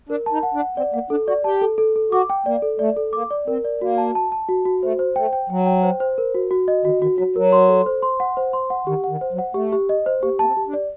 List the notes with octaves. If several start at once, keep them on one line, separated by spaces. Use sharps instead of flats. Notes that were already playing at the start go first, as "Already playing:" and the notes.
D4 A#4
A5
D#4
F#5
D4
F#5
C4 D5
A#3 F#5
D4 A4
F#4 D5
G4 A5
A4
A4
A4
F#4 D6
G5
A#3 D5
A4
A3 D5
A4
A#3 D6
D5
C4 A#4
D5
A#3 F#4
A5
A5
A5
F#4
F#4
A3 C5
C5
A3 G5
G5
F#3 G5
G5
C5
C5
A#4
F#4
F#4
D#5
D#3 F#4
D#3 F#4
F#3 F#4
F#3 A#4
C6
A4
C5
C6
F#5
C5
C6
F#5
D#3 G4
F#5
D#3
C5
F#3
F#5
A3 G4
G4
D#5
C5
A#3 G4
A#3 A5
C4
G4
D4
D5